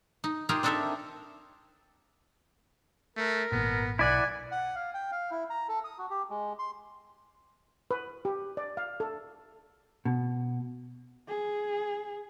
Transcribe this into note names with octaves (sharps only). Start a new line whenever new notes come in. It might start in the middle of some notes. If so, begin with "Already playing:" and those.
D#4
D#4 F4 G4 G#4 A#4
C4 D4 D#4 A4 A#4 E5
A3 A#4
G#1 A#2 B3
B1 E4 D5 F#5 G#5
F#5
F5
G5
F5
E4
A#5
A4
D#6
F#4
G4
G#3
C6
B4
G4
D5
F5
A4
B2
G#4